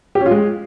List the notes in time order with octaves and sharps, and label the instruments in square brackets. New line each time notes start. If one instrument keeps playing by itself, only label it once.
[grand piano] G4
C#4
F4
G#3